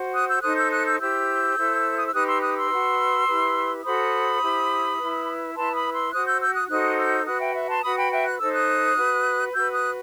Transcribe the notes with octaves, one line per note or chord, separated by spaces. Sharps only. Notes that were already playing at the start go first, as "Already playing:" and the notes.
Already playing: F#4 C5
D#6 F#6
E6 G6
D#4 A4 C5 D#6 F#6
E6 G6
D#6 F#6
E6 G6
E4 G4 C5 E6 G6
E4 A4 C5
D#6
E6
D#4 G4 B4 D#6 F#6
C6 E6
D#6 F#6
C6 E6
F#4 B4
E4 G4 B4
F#4 A4 C5 B5 D#6
E4 G4 C5
E4 B4
E4 B4 A5 C6
B5 D#6
C6 E6
F#4 C5 D#6 F#6
E6 G6
E6 G6
D#6 F#6
D#4 F#4 A4 C5 D#6 F#6
E6 G6
F#4 B4 D#6 F#6
E5 G5
E5
A5 C6
F#4 B4 B5 D#6
G5 B5
E5 G5
F#6
D#4 A4 C5 E6
D#6 F#6
F#4 B4
F#4 B4 E6 G6
D#6 F#6